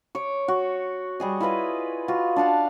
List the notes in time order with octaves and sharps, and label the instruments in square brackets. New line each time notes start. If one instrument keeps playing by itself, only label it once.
[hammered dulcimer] C#5 D6
F#4
G3 G#4 D#5
E4 F4 B4 D#5
F4 F#4
D4 F5 F#5 A5